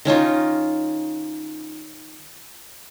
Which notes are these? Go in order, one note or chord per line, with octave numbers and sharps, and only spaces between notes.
D#3 C#4 D#4 F4